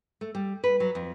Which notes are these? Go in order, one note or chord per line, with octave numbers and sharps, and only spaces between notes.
A3
G3
B4
F#3
F2